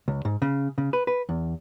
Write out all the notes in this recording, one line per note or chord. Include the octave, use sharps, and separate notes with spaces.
C#2
G#2
C#3
C#3
B4
B4
E2